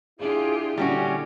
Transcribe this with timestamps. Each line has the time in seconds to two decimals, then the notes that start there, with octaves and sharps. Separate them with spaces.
0.20 D4 E4 F4 G4 G#4
0.77 A#2 D3 G3 C#4 F#4 G#5